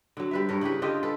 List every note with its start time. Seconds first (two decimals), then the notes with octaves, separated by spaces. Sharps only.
0.17 D3 F#3
0.31 G3 B4 E5
0.49 G2 A#4 C#5
0.61 C#3 E4 G4 B4
0.82 D3 F4 G4 D#5
1.03 A4 B4